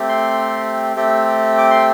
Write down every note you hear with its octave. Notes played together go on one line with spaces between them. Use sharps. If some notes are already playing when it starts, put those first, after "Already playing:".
Already playing: A3 C4 G4
C6
A3 C4 G4
D6
C6